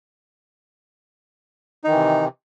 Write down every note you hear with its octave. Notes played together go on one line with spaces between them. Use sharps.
C3 D#3 E3 D#4